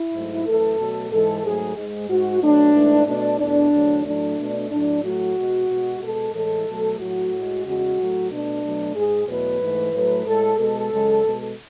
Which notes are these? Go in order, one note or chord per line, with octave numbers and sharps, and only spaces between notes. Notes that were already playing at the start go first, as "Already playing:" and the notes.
Already playing: E4
G#2 F#3 A3
F#2 E3 A3 A4
B2 F#3 A3
G#2 E3 G#3 A4
G#2 F#3 A3 G#4
G#2 G#3
G#2 G#3 F#4
B2 F#3 A3 D4
G#2 E3 A3
B2 A3 D4
E2 B2 A3 D4
E2 D3 F#3 A3
A2 F#3 A3 D4
B2 A3
A2 F#3 A3 D4
A2 F#3 A3 F#4
B2 G#3
B2 G#3
B2 G#3 A4
A2 E3 G#3 A4
B2 F#3 A3
A2 F#3 A3 F#4
A2 G#3
E2 C#3 G#3 F#4
A2 F#3 A3
B2 A3 D4
B2 F#3 A3
G#2 G#3 G#4
E2 B2 F#3 A3 B4
G#2 E3 A3
A2 F#3 A3 B4
A2 G#3 A4
B2 G#3 A4
F#2 C#3 G#3
B2 G#3